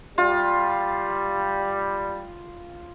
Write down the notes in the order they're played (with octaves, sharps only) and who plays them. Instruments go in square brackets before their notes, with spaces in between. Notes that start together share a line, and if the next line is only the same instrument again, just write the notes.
[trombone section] G3 [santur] F4